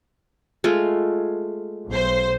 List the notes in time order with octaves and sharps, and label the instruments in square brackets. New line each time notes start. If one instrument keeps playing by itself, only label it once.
[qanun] G#3 A3 F4
[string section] B1 C5